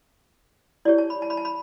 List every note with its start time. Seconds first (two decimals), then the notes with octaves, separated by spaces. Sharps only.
0.85 E4 G4 C#5 D5
0.98 A5
1.10 B5
1.22 A5
1.30 B5
1.37 A5
1.45 B5